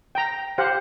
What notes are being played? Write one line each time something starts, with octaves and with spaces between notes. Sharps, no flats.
G5 A#5
G4 C5 F5 F#5